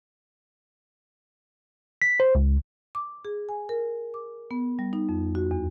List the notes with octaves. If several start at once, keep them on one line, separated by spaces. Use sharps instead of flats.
B6
C5
C#2
D6
G#4
G#5
A#4
D6
B3
G3
D#4
F2
F#4
E2